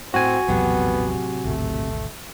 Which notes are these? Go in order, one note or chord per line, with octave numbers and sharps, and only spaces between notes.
A2 C4 F#4 G#5
A#1 E2 A2 C3 F#3 B3
G#1 D2 B2 A3